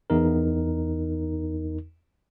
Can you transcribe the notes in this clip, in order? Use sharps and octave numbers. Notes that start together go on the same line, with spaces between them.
E2 D#4 A#4